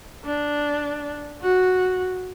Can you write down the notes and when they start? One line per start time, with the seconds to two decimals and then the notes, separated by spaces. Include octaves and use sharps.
0.25 D4
1.42 F#4